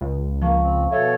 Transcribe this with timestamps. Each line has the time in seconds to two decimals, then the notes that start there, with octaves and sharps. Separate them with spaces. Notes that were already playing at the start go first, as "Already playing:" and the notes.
0.01 C#2
0.42 F3 A#3 F5 A5 C#6
0.61 C4
0.92 B2 A4 C#5 E5